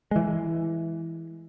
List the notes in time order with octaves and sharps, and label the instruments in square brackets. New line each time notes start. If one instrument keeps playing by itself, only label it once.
[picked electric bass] E3 G#3